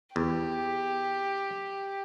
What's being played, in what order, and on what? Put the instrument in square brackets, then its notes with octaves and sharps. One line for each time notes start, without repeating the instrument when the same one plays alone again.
[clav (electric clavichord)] E2 [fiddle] G4